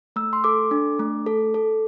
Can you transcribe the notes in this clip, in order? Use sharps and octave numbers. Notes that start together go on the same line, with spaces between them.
A3 E6
C6
A4 D6
D4
A3
A4
A4